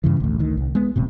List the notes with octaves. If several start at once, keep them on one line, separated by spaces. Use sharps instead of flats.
G2 C#3 E3
A1 D2
D2 D#3
C2
G#3 B3
D#1 A2 C3